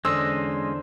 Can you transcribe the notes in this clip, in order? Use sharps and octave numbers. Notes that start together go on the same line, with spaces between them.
E2 D3 G#3 C#4 C5 D#5 E6